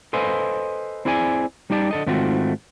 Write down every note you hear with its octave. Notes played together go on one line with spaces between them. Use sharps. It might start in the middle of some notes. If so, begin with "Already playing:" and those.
A4 B4 C5 D#5 F5 G#5
C4 E4 G#4 D5 G5 G#5
G3 D#4 G4 D5 A5
D3 A4 D#5
G#2 D#3 A3 C4 F4 F#4